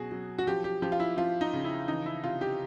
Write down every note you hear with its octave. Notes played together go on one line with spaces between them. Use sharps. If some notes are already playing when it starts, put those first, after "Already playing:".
Already playing: B2 F#3 F#4 G#4
F#3
F#4
F3 G4
G4
F3 G4
F4
E4
F3 F4
D#4
C#3
E4
E3 D#4
E4
C3 F4
G4